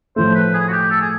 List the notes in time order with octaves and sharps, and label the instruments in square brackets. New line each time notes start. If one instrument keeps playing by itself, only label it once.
[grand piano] A2 F3 A3 [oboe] C5
[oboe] B4
G#4
F#4
G4
A4
G#4